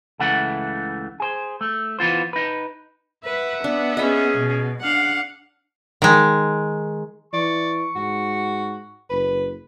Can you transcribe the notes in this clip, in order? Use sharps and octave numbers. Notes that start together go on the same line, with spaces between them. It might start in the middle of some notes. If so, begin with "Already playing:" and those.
C#2 C#3 E3 A3 F#5
G#4 C5
A3
E3 B3 F4 C5
D#4 B4
B4 E5 F#5
B3 D4
C#4 G#4 D#5 B5
B2
D4 F5 F#5
D#3 G#3
E3 D5 C#6
G#2 F#4
F#1 B4